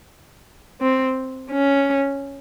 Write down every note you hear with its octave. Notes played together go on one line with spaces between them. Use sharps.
C4
C#4